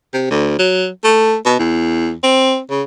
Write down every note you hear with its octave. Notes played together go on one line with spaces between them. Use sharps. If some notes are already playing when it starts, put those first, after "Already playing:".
C3
D2
F#3
A3
B2
E2
C4
C#3